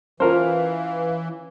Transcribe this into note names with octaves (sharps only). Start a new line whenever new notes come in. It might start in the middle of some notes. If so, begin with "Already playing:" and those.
E3 C#4 F4 A#4 C5 F5